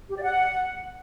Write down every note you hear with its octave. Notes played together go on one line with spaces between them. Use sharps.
G4
D5
F#5